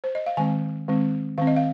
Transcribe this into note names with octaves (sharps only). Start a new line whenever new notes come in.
C5
D#5
F5
D#3 G#3 C4 G#5
D#3 G#3 C4
D#3 C4 F5
D#5
F5